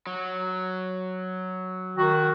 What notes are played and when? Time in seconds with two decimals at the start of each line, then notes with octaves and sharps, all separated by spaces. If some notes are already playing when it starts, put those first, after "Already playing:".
0.07 F#3
1.97 D#3 F#4